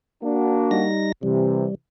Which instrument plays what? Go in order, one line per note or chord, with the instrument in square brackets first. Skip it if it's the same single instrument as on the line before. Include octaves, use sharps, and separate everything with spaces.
[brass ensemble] A#3 D4 F#4
[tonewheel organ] G3 D#4 A#6
[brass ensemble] C3 E3 [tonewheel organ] G3